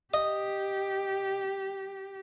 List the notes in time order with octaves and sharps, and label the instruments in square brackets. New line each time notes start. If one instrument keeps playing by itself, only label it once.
[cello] G4 [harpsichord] D#5